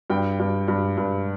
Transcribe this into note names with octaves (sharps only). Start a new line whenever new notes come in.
G2 G5
G2
G2
G2